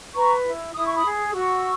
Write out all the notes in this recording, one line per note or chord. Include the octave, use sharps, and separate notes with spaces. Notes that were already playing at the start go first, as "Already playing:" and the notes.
B4 A#5 C#6
E4
E4 D#6
C#6
B5 D#6
G#4
F#4 C#6 E6